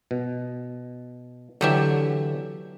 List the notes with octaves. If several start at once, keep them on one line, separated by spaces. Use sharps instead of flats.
B2
D3 E3 F#3 G4 E5 A5